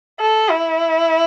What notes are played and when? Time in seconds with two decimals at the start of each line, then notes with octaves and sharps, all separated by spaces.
0.21 A4
0.51 E4